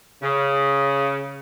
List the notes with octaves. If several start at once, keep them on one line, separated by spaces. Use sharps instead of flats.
C#3